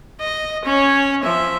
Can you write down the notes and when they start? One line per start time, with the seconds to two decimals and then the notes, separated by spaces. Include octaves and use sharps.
0.20 D#5
0.65 C#4 C#5
1.23 F3 E5